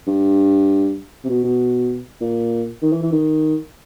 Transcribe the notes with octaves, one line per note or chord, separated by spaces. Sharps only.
G2
C3
B2
B2
A#2
D#3
E3
E3
D#3